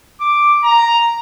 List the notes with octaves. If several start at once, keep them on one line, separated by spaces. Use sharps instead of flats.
D6
A#5